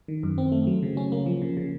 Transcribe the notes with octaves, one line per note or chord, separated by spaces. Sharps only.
D#3
F#2
C4
A3
F#3
C#3
C#4
A#3
F3
C#3
C#3